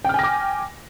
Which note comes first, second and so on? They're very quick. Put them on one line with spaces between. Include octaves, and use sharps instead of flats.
G5 F6 G#5 A#6 D6